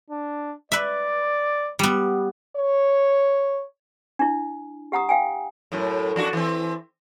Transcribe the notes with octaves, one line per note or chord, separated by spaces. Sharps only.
D4
B4 D5 E5
G3 B3
C#5
D4 E4
G4 F#5 A#5 D#6
F5 G5 G#5
F#2 A2
F2 D4 F#4
E3 C4